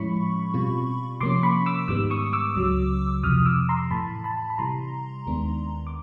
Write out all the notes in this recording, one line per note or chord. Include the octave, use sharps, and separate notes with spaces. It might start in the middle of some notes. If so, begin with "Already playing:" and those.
Already playing: A2 F3 G#3 C#4 E4 B5 C#6
B2 G3 C4 F4
C3 F3 A#3 C#4 C6 D6
B5 C#6
D6 E6
G#2 D#3 G3 B3 D6 E6
C#6 D#6
D6 E6
C#2 C#3 F#3
F2 C3 F3 D#6 F6
D6 E6
A#5 C6
A2 E3 A3 A5 B5
A5 B5
B5
C3 E3 G3 A#5 C6
D#2 D#3 G#3 B3 D4
D6